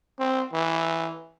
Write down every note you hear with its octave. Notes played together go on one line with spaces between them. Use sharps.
C4
E3